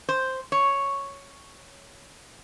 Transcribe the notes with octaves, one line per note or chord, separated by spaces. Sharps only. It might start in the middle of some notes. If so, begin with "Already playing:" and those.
C5
C#5